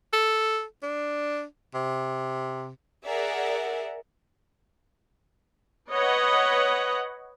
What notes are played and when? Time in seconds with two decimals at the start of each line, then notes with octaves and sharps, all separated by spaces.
0.13 A4
0.83 D4
1.74 C3
3.05 G#4 A#4 D5 E5 F#5
5.91 B4 C#5 D#5 F#5